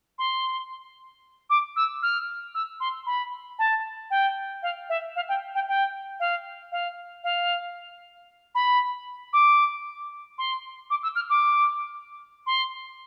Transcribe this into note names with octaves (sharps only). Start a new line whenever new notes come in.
C6
D6
E6
F6
E6
C6
B5
A5
G5
F5
E5
F5
G5
G5
G5
F5
F5
F5
B5
D6
C6
D6
E6
F6
D6
C6